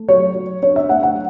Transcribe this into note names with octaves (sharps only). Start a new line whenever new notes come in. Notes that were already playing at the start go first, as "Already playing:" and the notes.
Already playing: A3
F#3 C#5
F#3
D4 C#5
E5
A3 F#5
F#5